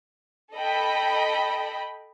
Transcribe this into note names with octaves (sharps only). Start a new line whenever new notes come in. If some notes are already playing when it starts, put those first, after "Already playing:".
A4 D#5 G5 B5